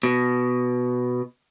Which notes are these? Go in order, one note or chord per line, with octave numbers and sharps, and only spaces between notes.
B2